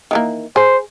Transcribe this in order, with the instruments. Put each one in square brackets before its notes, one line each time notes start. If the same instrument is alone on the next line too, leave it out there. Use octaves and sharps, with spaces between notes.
[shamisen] D#3 E3 A#3
[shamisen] G#4 [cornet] C5